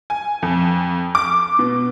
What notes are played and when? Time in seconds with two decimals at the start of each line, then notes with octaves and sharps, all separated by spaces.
0.10 G#5
0.42 F2
1.15 D6
1.59 B2